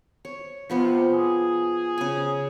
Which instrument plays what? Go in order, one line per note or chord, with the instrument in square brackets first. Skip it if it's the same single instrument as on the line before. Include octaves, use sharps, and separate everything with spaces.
[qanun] C#5
[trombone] C3 [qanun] F3 B3 F4
[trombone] G#4
[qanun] C#3 G#5